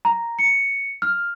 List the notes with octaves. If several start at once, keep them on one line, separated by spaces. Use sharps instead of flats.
A#5
C#7
F6